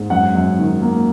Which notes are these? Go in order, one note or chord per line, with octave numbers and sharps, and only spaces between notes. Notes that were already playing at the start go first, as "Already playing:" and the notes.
Already playing: G#2
F#2 F#5
F#2
D#3
A#3